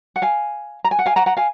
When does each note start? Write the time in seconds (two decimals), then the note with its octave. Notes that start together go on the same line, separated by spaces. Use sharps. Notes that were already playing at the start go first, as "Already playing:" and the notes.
0.16 F#5
0.22 F5 G#5
0.84 A#5
0.91 G#5
0.99 F#5
1.06 F5 G#5
1.16 F#5 A#5
1.26 F#5 A#5
1.37 F5 G#5